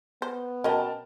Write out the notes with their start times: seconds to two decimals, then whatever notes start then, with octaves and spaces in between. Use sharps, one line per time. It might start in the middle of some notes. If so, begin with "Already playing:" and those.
0.22 B3 C5
0.64 B2 C#4 A#4 D#5 G5 A5